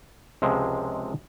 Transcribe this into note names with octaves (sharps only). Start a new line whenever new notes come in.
C#2 C3 F3 G#3